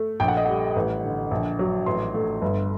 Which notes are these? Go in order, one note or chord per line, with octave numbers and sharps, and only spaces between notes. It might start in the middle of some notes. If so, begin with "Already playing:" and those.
Already playing: A3
A#1 G5
F#5
D#5
G3 F#5
A1
D3
A#1
F#3
A1 C6
A3
G1